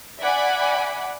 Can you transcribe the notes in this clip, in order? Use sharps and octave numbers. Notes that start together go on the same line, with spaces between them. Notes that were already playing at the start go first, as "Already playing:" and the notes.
D5 E5 F#5 G#5 B5 D6